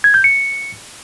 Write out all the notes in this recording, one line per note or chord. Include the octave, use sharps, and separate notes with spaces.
G#6
G6
C#7